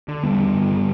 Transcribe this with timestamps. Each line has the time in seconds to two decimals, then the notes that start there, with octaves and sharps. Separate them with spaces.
0.08 D3
0.24 E2 G3 B3
0.39 D3
0.54 G2
0.70 D3